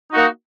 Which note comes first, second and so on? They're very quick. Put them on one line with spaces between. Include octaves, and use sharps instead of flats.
D#4 F#4 A#3